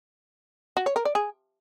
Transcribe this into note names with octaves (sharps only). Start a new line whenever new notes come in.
F#4
C#5
A#4
D5
G#4